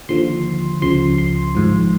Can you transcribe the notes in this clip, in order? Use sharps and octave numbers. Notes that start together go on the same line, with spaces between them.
D#2 D3 F3 C6
C#2 C#3 F3 C6
C6
G#1 G#2 F3